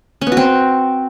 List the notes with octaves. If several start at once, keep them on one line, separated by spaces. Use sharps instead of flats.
C#4
B3
F#4
C4